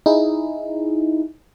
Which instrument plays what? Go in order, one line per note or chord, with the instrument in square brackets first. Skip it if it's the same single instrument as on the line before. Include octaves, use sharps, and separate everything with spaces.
[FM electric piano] D#4 E4 G#4